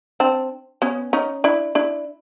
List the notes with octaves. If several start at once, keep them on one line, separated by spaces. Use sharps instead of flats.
C4 D4
B3 C#4
C#4 D#4
D4 E4
D4 E4